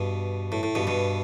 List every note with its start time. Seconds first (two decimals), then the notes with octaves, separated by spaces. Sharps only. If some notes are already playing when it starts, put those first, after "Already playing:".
Already playing: G2 B2
0.52 A2
0.63 A2
0.75 G2 B2
0.87 G2 B2